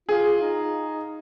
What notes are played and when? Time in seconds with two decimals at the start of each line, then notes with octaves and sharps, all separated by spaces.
0.09 F4 G#4
0.42 D#4